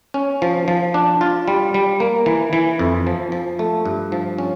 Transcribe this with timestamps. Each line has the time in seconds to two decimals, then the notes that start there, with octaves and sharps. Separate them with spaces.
0.14 C#4
0.42 F3
0.68 F3
0.94 D4
1.21 F4
1.48 G3
1.74 G3
2.00 A#3
2.26 E3
2.53 E3
2.79 F2
3.07 F3
3.32 F3
3.59 A3
3.85 G2
4.12 F3
4.38 C#4